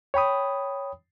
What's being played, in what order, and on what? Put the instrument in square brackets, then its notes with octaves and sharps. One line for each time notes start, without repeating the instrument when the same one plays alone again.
[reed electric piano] C#5 G5 B5 D#6